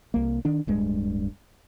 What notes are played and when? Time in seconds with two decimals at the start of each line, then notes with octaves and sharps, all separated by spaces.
0.14 C2 A#3
0.45 D#3 D4
0.67 D1 G2 G#3